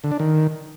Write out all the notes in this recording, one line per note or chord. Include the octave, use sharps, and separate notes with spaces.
D3
D4
D#3